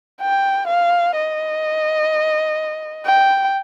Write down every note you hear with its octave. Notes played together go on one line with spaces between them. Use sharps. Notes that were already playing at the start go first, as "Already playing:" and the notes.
G5
F5
D#5
G5